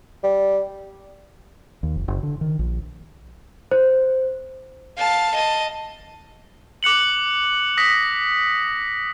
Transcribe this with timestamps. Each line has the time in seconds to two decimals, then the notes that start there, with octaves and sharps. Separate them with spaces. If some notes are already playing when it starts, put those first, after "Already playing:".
0.24 G3
1.83 D#2
1.96 F1
2.08 F#1
2.23 D3
2.41 D#3
2.59 A#1
3.71 C5
4.98 F5 A5
5.34 D#5 A5
6.83 D6 F#6 C#7 F#7
7.77 D#6 A#6 B6